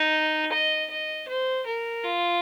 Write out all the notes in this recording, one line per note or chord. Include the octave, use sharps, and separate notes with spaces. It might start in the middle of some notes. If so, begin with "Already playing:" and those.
Already playing: D#4
D#5
D#5
C5
A#4
F4